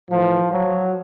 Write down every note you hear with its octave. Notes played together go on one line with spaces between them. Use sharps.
A2 E3 F3
F#3